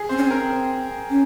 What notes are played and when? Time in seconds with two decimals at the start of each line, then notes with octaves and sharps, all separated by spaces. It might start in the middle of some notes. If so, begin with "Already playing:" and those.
Already playing: G#4
0.09 C4 C5
0.17 C#4
0.24 C4
0.31 A#4
1.10 C#4